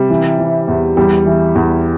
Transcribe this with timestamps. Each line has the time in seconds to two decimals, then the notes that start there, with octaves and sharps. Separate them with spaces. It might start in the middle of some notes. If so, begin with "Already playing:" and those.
Already playing: C3 G3
0.10 E3
0.39 E3
0.68 E2
0.97 E2 G3
1.26 E3
1.55 E2